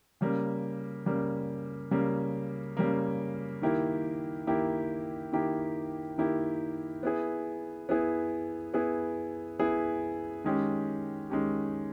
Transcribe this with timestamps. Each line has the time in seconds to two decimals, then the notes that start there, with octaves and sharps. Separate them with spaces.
0.21 C#3 G3 A#3
1.06 C#3 G3 A#3
1.91 C#3 G3 A#3
2.77 C#3 G3 A#3
3.62 D#3 A#3 E4 G4
4.47 D#3 A#3 E4 G4
5.32 D#3 A#3 E4 G4
6.18 D#3 A#3 E4 G4
7.03 B3 E4 G#4
7.89 B3 E4 G#4
8.74 B3 E4 G#4
9.59 B3 E4 G#4
10.44 D#3 G#3 C#4 G4
11.30 D#3 G#3 C#4 G4